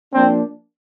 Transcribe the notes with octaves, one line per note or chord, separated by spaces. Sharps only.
F3 A#3 C4 D4